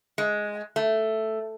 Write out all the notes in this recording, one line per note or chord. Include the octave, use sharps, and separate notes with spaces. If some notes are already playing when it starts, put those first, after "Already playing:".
G#3
A3